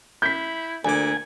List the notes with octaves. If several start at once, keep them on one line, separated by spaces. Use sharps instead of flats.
E4 G6 B6
D2 A#2 G#5 D6